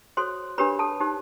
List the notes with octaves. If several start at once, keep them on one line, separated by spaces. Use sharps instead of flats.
F#4 A4 C5 C#5 C6
D4 G4 A#4 B4 C#5 B5
A4 A5
D#4 G4 C5